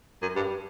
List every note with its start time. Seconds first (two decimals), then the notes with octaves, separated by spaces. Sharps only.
0.22 F#2
0.36 G2